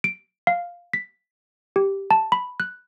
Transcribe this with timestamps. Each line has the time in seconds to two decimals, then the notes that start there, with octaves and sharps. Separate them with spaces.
0.04 D7
0.47 F5
0.93 B6
1.76 G4
2.11 A5
2.32 B5
2.60 F#6